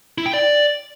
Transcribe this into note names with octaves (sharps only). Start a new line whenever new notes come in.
E4
G5
D5